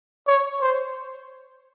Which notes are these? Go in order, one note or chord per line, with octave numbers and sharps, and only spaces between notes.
C#5
C5